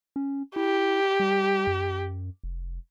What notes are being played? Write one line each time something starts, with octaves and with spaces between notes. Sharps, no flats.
C#4
E4 G4
G3
F#2
F1